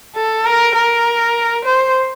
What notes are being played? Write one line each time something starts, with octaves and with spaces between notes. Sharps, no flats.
A4
A#4
A#4
C5